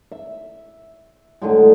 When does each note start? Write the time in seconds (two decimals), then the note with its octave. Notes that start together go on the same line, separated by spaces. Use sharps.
0.12 E5
1.42 A2 D3 F#3 G#3